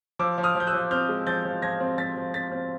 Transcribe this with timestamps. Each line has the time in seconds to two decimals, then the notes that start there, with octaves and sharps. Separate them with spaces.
0.19 F3 D6 E6
0.38 F3
0.43 D#6 F6
0.55 F3
0.60 G6
0.67 E6 F#6
0.73 F3
0.91 C4 F6 G6
1.09 G#3
1.27 F3 G6 A6
1.45 F3
1.62 F3 G#6 A#6
1.80 C4
1.98 F3 A6 B6
2.16 F3
2.34 C4 A6 B6
2.52 C4